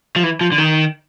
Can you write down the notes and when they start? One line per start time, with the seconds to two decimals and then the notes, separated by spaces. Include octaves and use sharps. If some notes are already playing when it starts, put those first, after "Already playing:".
0.16 F3
0.24 E3
0.41 F3
0.52 D3
0.58 D#3